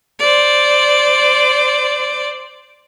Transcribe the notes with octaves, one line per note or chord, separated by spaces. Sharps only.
C5 D5